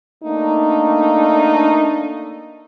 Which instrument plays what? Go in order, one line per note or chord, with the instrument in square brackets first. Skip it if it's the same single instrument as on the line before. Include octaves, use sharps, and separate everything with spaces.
[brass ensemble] A3 A#3 D4 D#4